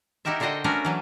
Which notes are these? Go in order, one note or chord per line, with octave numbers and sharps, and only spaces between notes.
D#4 E4 F#4 G4 A#4 E5
D3 D4 F#4 C5 D#5 G5
A3 C#4 D4 F#4 A#4 B4
E3 F#3 B4